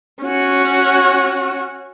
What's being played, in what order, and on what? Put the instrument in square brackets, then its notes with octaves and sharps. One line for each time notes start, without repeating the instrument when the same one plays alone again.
[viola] C#4 F#4